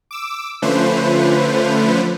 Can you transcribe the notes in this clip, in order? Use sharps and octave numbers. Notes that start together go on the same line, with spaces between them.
D6 E6
D3 F3 A3 C#4 B4 C5